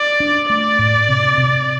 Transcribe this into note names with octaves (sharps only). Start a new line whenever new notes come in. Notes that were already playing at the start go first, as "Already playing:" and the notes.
Already playing: D5
D4
A3 D5
A2
C3
C3